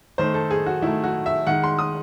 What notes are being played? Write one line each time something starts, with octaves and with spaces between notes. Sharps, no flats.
D#3 A3 C5
A4
G#4
F#4
D#3 A3 E4
F#4
E5
D#3 G#3 F#5
C6
D#6